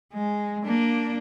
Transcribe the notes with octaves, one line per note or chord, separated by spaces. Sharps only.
G#3
A#3 D4